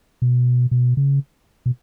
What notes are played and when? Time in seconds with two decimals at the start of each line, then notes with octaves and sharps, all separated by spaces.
0.22 B2
0.71 B2
0.97 C#3
1.66 B2